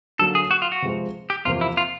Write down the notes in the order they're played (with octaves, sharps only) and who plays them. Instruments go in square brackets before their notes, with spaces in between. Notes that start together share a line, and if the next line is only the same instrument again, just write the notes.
[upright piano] D3 F#3 A#3 [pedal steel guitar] A4
[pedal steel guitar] G#4
F#4
F4
F#4
[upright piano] C3 F3 G#3 C4
[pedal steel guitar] G4
[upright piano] E2 C3 F3 A#3 [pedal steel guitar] F4
[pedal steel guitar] E4
F4